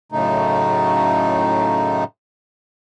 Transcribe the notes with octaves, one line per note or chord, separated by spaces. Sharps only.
F#2 A2 C#3 A3 D#4